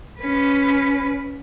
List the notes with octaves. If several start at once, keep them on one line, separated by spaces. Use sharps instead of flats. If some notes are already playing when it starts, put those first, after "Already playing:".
C#4 B4